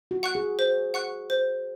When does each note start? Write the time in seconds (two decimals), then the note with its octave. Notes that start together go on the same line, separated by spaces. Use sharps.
0.11 F#4
0.23 F#5 C#6 F#6
0.35 G#4
0.59 C5
0.94 F#5 C#6 F#6
1.30 C5